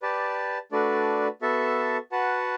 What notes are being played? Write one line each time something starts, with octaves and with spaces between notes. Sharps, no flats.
G4 B4 D5 A5
A3 D4 F#4 B4 D5
B3 F#4 A4 E5 A5
F#4 B4 F#5 A5